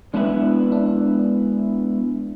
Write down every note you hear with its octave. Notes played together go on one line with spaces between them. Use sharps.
G#3 B3 D4 E4 B4 E5
D4